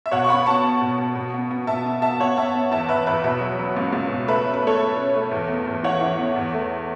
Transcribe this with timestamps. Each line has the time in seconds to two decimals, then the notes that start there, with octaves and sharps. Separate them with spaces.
0.06 E5
0.11 B2 C#5 F#5
0.24 C#6
0.29 B3 F#5 B5
0.46 B3 A5 C#6
0.64 B3
0.81 B2
0.98 B2
1.15 B2
1.34 B3
1.51 B3
1.67 B2 E5 A5
1.86 B3
2.02 B3 E5 A5
2.20 B3 C#5 F#5
2.37 B3 E5 A5
2.55 B3
2.71 E2 E5 A5
2.89 E2 B4 E5
3.06 E2 B4 E5
3.24 B2 B4 E5
3.41 F#3
3.59 F#3
3.77 C#2
3.93 C#2
4.10 B2
4.27 A3 B4 E5
4.45 C#4
4.54 B4
4.63 A3 A4 C#5
4.80 A3
4.97 C#4
5.15 A3
5.31 E2
5.49 B3
5.67 E2
5.83 E3 C#5 F#5
6.01 E3
6.18 B3
6.36 E2
6.53 A3